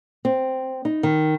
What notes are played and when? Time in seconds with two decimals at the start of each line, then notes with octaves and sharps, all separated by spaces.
0.25 C4
0.85 D#4
1.03 D#3